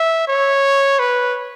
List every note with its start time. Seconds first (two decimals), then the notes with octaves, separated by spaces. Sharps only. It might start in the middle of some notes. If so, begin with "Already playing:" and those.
Already playing: E5
0.28 C#5
0.99 B4